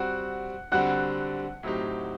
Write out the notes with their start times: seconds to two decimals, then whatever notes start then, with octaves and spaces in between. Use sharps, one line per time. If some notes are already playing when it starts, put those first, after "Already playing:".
Already playing: G3 C4 F#4 F#5 F#6
0.72 D3 G3 C4 F#4 F#5 F#6
1.63 A2 F#3 C4 D#4 G4